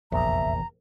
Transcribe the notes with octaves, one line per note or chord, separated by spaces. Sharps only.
F1 A#1 E2 E5 A#5